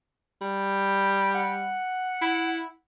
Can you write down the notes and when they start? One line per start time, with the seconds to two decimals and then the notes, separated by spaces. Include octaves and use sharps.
0.41 G3
1.35 F#5
2.21 E4